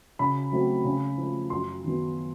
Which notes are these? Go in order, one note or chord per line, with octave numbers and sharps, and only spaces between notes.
C#3 B5
F#3 A3 C4
C#3
F3 A3
F#2 C6
D#3 F#3 B3